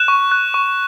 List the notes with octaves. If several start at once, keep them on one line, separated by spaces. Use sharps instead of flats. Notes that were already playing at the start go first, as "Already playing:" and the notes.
Already playing: F#6 E7
C#6
F#6
C#6